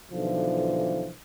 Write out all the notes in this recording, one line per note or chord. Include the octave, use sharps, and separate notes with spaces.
B1 D3 E3 F3